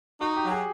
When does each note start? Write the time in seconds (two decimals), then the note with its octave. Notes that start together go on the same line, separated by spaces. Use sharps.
0.21 D#4 F#4
0.36 G4
0.44 F#3
0.51 G#4